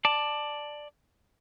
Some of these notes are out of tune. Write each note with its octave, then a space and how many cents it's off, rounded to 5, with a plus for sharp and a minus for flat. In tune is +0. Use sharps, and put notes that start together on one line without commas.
D5 +10 A5 +0